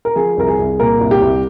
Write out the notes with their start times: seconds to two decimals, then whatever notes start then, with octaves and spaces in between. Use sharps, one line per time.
0.05 A#4
0.16 F3 G#4
0.37 C2 A#4
0.48 G#4
0.59 C2
0.80 A#2 A#4
1.01 C2
1.11 G4
1.22 C2